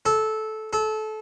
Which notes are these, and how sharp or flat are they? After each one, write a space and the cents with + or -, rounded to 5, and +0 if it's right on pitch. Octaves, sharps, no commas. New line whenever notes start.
A4 -15
A4 -25